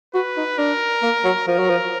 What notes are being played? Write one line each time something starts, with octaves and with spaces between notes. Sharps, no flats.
F#4 B4
D#4
D4 A#4
A#3
F#3
F3 A#4
F#3
F3